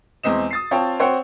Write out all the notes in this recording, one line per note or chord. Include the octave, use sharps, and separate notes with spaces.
E2 G#3 C4 D#5 E7
D#6 A6 C7
C4 F4 C#5 G5 A5
C4 C5 C#5 F#5 G5 C#7